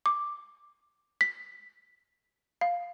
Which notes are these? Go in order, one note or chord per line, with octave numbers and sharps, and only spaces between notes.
D6
B6
F5